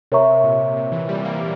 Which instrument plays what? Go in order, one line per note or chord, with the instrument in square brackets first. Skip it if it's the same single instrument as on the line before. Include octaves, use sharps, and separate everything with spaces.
[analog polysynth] C3 [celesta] A#4 C#5 E5 A#5 C#6
[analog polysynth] A#2
C3
E3
G3
A#3